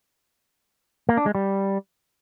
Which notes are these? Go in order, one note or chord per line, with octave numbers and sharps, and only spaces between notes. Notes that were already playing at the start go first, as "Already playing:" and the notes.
A#3
D4
G#3
G3